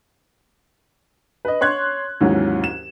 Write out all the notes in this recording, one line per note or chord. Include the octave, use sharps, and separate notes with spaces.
B4 D#5
C#5 C6 F#6 G#6
D#2 G#2 E3 F#3 C#4
E7